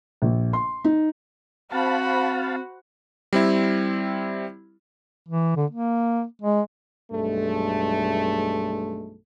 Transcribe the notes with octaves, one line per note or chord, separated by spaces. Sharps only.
A#1
C6
D#4
C4 F#4 C5 F5 A5 B5
G3 C4 E4
E3
D3
A#3
G#3
B1 G2 G#3 A3